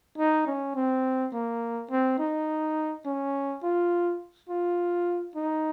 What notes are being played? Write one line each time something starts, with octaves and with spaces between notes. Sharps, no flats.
D#4
C#4
C4
A#3
C4
D#4
C#4
F4
F4
D#4